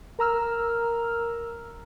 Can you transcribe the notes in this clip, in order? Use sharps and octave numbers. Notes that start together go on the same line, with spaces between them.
A#4 A#5 E6 F6